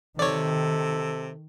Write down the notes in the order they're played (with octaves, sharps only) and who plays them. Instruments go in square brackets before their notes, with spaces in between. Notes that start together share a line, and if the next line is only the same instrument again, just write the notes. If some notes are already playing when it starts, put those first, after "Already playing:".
[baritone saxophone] C3 [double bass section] D#3 [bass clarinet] A4 [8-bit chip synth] C#5 D5